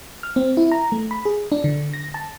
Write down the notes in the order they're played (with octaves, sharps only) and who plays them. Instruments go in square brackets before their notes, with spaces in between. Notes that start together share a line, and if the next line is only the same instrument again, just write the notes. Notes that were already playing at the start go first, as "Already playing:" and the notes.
[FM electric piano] F6
C4
E4
A#5
A3
B5
G#4
D4
D3
A#6
A5